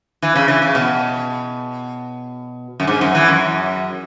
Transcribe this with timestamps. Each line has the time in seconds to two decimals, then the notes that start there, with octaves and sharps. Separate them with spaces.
0.22 E3
0.36 C#3
0.48 E3
0.62 C#3
0.75 B2
2.80 F#2
2.87 G#2
3.01 F#2
3.15 E3
3.28 F#2